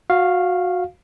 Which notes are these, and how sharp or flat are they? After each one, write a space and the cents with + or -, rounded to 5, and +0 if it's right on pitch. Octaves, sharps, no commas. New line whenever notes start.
F#4 -20 F5 +0